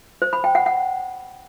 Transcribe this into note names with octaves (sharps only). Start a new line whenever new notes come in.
C5
B5
G5
F#5
F#5